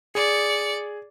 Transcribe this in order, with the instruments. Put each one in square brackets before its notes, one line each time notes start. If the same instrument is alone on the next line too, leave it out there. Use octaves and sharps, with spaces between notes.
[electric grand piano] G#4 [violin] D5 C#7